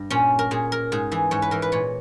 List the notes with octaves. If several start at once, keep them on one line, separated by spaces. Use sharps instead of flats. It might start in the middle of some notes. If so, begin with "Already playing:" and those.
Already playing: G2
A#2 C#4
A#4
A#2 G#4
A#4
G#2 G#4
E3 G#4
G#2 C#5
B4
E3 A#4
B4
A#2 C#5